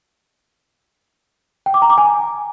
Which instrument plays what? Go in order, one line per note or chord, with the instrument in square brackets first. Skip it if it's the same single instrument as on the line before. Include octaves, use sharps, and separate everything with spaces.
[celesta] G5
D6
A#5
D6
G#5